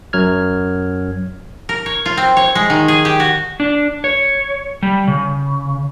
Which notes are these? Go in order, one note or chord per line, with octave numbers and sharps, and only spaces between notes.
F#2 F#3 F6 G#6
A#4
C#5
F4
C4
C#5
G#3
D#3
G#4
G4
F#4
D4
C#5
G3
C#3